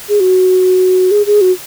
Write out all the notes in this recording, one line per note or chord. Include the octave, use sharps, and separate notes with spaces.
G#4
F#4
G#4
G#4
F#4